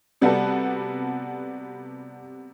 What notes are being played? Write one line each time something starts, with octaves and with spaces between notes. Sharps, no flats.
C3 G3 B3 F#4 A4